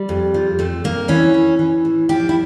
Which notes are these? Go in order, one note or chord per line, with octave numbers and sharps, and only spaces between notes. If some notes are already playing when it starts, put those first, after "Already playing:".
Already playing: G3
F2
F3
F2 A3
F2 A#3
E3 C#4
E3
E3
A2
F3 G4
E4